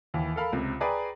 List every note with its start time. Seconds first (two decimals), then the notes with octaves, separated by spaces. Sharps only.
0.14 D#2 E3
0.36 A4 A#4 F5 B5
0.53 C#2 C3
0.80 G#4 B4 D5 G5 A#5